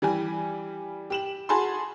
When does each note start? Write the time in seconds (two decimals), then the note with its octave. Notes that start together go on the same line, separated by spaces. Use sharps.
0.02 E3 G3 G4 G#5
1.10 G4 E7 F#7
1.49 F#4 G#4 G#5 A5 B5 C6